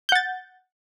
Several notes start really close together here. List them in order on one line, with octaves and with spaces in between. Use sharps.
G6 F#5 A6